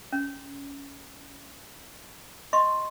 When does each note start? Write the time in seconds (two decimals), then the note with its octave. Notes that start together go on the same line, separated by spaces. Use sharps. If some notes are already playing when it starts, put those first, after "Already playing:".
0.13 C#4
2.53 D#5 C6 C#6